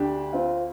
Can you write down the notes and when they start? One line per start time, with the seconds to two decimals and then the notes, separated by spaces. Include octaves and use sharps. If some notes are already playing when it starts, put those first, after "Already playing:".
Already playing: D2 D3 D4 G4
0.33 C4 F4